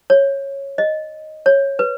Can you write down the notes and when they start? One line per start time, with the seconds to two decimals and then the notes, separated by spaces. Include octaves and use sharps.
0.10 C#5
0.78 D#5
1.46 C#5
1.79 B4